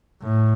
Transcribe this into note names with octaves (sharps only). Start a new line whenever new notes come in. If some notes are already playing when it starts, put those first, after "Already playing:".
A2